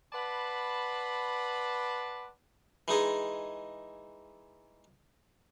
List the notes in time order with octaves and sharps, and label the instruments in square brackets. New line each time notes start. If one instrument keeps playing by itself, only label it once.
[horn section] B4 D5 F#5 A5 B5 C6
[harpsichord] E3 G#3 D#4 G#4